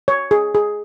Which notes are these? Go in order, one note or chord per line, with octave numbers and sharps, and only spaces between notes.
C#5
G#4
G#4